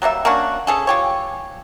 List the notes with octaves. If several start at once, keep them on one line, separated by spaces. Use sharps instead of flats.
F#3 G3 A#3 E5
A#3 C#4 D4 F#4
C#4 G#4 A4
F4 G4 C#5